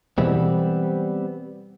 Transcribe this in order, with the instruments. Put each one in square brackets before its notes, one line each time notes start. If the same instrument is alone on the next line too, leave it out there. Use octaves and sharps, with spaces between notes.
[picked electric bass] B2 E3 G#3 [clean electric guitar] G3 B3 C4